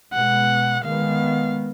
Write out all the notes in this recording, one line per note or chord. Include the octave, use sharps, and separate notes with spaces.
B2 G#3 B3 F#5
D#3 G#3 B3 F5